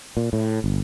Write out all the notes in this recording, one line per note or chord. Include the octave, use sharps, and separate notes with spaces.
A#2
A2
G1